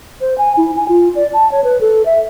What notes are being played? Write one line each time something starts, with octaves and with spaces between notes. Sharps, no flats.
C5
G#5
E4
G#5
F4
D5
A5
C#5
B4
A4
E5